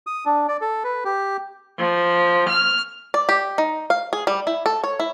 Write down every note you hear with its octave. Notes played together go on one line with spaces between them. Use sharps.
D#6
D4
D5
A4
B4
G4
F3
F6
D5
G4
D#4
F5
G#4
G3
E4
A4
C#5
E4